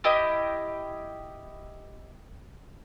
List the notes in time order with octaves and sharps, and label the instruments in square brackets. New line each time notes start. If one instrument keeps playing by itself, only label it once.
[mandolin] E4 G4 D#5